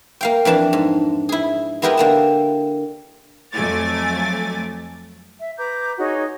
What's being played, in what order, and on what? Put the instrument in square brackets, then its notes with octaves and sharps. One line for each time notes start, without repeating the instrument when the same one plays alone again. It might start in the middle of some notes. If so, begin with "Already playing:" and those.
[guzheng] A#3 F5 G5
F2 E3 D4 A5
G#2
E4 G#4
G#3 B3 E4 G4 A#4 D#5
D3 A#3 A5
[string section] F2 F#3 A3 G#5 D6 A6
[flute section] E5
B4 A#5 D6 G6
D#4 F#4 G#4 C#5